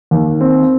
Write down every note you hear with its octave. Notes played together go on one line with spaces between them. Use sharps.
D#2
C4